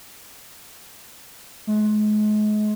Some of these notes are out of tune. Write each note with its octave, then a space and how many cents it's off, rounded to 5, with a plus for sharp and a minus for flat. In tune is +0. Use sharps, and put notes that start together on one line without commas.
G#3 +35